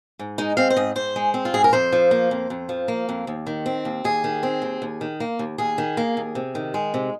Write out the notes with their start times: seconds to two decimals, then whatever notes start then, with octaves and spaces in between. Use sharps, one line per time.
0.19 G#2
0.38 G#3 D#4
0.57 C4 F5
0.70 C5
0.77 G#2 D#5
0.95 G#2 C5
1.16 G#3
1.34 C4
1.45 F4
1.54 G#2 G#4
1.64 A#4
1.73 F2 C5
1.92 F3
2.11 A#3
2.31 F2
2.50 F2
2.69 F3
2.88 A#3
3.09 F2
3.27 D#2
3.47 D#3
3.66 C4
3.85 D#2
4.04 D#2 G#4
4.24 D#3
4.43 C4
4.62 D#2
4.82 D#2
5.01 D#3
5.20 A#3
5.39 D#2
5.58 D#2 G#4
5.78 D#3
5.97 A#3
6.17 D#2
6.35 C3
6.55 D#3
6.74 G#3
6.94 C3